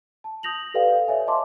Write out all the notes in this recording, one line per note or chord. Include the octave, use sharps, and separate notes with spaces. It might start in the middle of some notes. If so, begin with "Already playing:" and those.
A5
D#6 G6 A#6 F7 F#7
G4 A4 B4 D5 F5 G5
C#5 E5 G#5
C#5 D#5 E5 A5 C6 D6